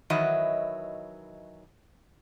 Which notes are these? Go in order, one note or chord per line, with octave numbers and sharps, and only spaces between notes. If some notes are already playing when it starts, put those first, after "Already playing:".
D#3 E3 F#3 D#5 E5